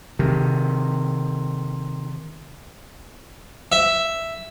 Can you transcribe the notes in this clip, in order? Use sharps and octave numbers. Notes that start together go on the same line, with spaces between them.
C3 D#3
E5